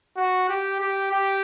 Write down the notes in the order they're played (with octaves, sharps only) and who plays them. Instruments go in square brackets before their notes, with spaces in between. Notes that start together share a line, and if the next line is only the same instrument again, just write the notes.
[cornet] F#4
G4
G4
G4